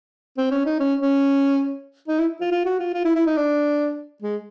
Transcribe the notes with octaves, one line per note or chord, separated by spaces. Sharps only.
C4
C#4
D#4
C#4
C#4
D#4
E4
F4
F4
F#4
F4
F4
E4
E4
D#4
D4
G#3